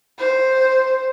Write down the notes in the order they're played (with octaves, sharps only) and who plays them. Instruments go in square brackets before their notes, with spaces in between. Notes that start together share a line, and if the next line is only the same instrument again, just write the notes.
[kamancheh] C5